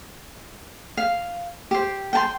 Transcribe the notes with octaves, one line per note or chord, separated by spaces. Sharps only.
F5
G4 C5
G5 A5 C6